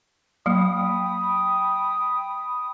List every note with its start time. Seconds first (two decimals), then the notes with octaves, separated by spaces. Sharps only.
0.46 F#3 A#3 G5 B5 D#6